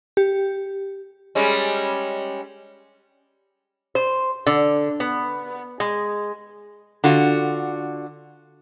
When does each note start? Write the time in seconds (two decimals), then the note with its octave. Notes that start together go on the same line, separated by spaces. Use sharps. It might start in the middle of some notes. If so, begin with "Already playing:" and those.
0.17 G4
1.35 G3 G#3 C#4
3.95 C5
4.46 D3
5.00 B3
5.80 G#3
7.04 D3 F4 F#4